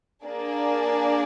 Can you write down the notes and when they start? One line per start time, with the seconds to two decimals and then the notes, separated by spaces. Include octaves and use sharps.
0.24 A#3 D4 G#4 D5